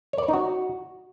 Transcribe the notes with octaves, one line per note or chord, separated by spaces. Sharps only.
C#5
D5
C#5
D#4
F#4